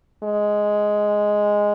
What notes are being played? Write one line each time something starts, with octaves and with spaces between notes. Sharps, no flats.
G#3